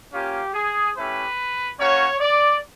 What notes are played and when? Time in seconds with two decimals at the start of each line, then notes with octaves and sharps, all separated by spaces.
0.12 A#3 C#4 F4 G4
0.54 G#4
0.95 A3 C#4 E4 G4 B4
1.78 A#3 C#4 F#4 C#5
2.20 D5